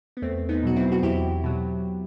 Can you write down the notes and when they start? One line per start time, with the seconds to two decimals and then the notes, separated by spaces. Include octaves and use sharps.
0.17 B3
0.22 E2 A3 C4
0.49 B3 D#4
0.63 B2 F#3 F#4
0.76 C4 E4
0.92 F#4
1.03 E2 E4 G4
1.44 B2 F#3